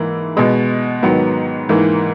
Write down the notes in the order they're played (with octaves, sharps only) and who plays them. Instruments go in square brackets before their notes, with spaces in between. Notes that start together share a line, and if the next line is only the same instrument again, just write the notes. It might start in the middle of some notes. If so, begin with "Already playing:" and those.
Already playing: [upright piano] G#2 E3 A#3 E4
B2 G#3 B3
G#2 D#3 F#3 B3
G#2 E3 A#3